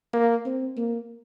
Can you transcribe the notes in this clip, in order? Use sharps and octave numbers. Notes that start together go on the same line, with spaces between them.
A#3
C4
A#3